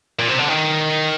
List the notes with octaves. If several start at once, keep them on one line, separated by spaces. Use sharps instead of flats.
A#2
C3
D3
D#3